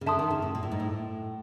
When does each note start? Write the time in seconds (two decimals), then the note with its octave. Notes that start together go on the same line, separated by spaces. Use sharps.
0.01 C#3
0.06 D3 E5 A5 C6 D#6
0.19 D#3
0.30 C#3
0.42 A2
0.55 A#2
0.63 A2
0.72 G#2
0.80 A2